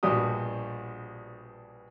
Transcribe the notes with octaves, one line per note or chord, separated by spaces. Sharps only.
A#1 G2 B2 F#4 G4 D#6